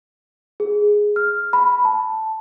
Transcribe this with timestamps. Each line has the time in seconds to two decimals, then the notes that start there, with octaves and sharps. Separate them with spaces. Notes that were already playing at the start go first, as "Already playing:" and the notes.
0.60 G#4
1.16 F6
1.53 B5
1.85 A5